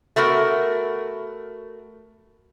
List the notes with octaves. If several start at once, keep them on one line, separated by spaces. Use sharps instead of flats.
A3 B3 F#4 A#4